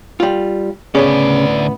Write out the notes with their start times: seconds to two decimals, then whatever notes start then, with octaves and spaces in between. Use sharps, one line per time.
0.20 G3 F4
0.95 D2 A2 C#3 B3 C#4 D5